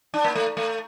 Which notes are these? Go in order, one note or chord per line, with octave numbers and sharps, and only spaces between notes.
D4
A#3
A3
A3